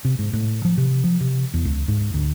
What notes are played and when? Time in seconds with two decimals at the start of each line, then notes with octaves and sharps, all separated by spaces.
0.05 C3
0.19 G#2
0.33 A2
0.65 F3
0.78 C3
1.04 F3
1.21 C3
1.54 E2
1.65 C#2
1.88 G#2
2.14 D2